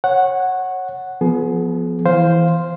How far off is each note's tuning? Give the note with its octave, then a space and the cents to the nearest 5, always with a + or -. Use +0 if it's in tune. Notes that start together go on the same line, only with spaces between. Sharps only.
C#5 -20 F#5 +0
F3 +0 B3 +0 G#4 +35
E3 +0 C5 +0 F5 +0